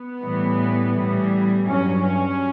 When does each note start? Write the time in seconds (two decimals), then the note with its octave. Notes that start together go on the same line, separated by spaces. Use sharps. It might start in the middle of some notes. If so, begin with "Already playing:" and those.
Already playing: B3
0.22 A2 E3 G3
0.94 A2 E3 G3
1.66 G2 F#3 C#4
2.03 C#4